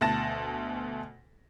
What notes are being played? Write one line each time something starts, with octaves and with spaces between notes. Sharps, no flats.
D2 B2 A5 A6 A#6 E7